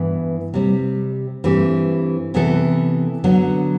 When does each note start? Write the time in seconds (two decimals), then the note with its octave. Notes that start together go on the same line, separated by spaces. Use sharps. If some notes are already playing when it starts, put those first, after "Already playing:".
Already playing: G2 E3 B3 E4 B4
0.54 C3 G3 C4
1.44 G2 E3 A3 C4 G4
2.34 C3 E3 B3 E4 A4
3.24 D3 F#3 B3